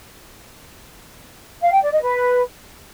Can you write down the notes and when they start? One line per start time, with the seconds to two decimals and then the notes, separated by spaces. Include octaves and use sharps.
1.62 F5
1.72 G5
1.82 D5
1.92 D#5
2.02 B4